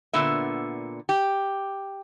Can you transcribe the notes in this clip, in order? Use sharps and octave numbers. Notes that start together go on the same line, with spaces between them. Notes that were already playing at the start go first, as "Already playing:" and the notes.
A#2 D3 B3 E5
G4